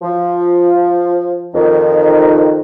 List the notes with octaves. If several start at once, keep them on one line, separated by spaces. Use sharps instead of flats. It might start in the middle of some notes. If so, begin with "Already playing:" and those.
F3
F2 D#3